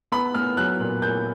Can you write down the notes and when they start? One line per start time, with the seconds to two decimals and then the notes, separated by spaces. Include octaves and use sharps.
0.12 B3 B5
0.34 B3 F6
0.57 F#3 F#6
0.80 A#2
1.01 A#2 G6